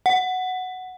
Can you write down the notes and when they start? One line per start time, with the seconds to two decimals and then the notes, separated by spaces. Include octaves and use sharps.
0.06 F#5